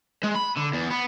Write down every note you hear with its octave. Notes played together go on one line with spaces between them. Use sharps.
G#3
B5
D3
E2
B3